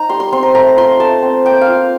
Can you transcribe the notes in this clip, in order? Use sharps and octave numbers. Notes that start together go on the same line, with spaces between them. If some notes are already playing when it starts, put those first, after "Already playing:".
Already playing: D#4 A#5
G3 C6
C6
C4 C6
A#5
A3 A#5
F4 C6
A3 A5
C4
A#3 G5
F5
F4